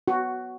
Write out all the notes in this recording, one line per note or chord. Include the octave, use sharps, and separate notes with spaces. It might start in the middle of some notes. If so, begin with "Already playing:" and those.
F#4